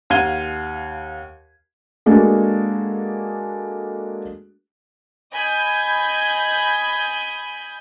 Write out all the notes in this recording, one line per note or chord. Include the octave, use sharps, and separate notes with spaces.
D#2 F5 F#5 G#6 D#7 G7
G#3 A#3 D4 F#4 G#4 A4
D#5 G#5 B5 G6 G#6